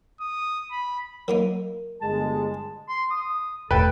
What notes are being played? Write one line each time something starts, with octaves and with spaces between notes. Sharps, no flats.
D#6
B5
F#3 A#3 D#4 A#4
G1 G#3 A5
C6
D#6
E1 A2 A4 B4 G5